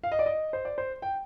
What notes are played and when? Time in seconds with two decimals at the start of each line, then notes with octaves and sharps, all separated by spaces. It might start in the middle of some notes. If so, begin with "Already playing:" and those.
0.04 F5
0.12 D#5
0.19 D5
0.26 D#5
0.53 C5
0.65 D5
0.78 C5
1.02 G5